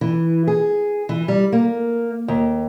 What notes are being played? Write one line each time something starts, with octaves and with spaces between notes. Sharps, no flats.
E3
G#4
E3
G3
A#3
D#2